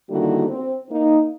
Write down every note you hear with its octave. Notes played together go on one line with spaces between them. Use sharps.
D3 D#3 G3 A#3 E4 F#4
C4
A#3 D#4